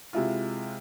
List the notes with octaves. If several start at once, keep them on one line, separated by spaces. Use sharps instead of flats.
C3 G#3 E4 F4